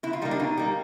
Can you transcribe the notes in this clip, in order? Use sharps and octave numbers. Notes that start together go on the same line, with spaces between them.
B2 E4
F4
G3 A#3 D#4
D4
B2 D#4
G3 A#3